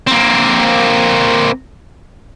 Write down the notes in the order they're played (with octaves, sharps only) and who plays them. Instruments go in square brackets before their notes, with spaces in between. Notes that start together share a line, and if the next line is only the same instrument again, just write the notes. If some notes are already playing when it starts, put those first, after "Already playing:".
[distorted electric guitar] A#3 C4